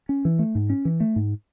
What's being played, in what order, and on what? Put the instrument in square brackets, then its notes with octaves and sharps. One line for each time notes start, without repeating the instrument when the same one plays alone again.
[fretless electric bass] C#4
E3
A3
G#2
C#4
E3
A3
G#2